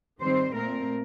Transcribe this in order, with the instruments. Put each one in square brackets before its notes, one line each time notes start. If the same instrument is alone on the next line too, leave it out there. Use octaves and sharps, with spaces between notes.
[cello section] D#3 G3 C4 C5
A#2 A3 C4 A#4